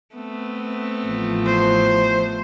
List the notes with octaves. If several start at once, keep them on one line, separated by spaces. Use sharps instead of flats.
A3 B3 C4
A1 F3
C5